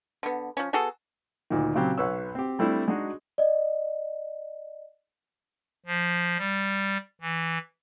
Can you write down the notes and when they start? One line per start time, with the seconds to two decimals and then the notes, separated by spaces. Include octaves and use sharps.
0.23 D3 B3
0.57 F3 C#4
0.73 B3 F#4 G#4 A4
1.50 D2 A#2 D#3
1.75 A#2 C#3 F#3 C4 G4
1.98 B1 B4 C#5 E6
2.35 C4 G4
2.59 G3 A3 C4 D4 E4
2.88 G#3 D4 D#4 F#4 G#4
3.38 D5 D#5
5.86 F3
6.39 G3
7.21 E3